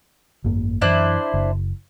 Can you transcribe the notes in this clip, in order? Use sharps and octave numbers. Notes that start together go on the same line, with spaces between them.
G#1 F#2 A#3
F#2 E3 D4 E4 C5
F#1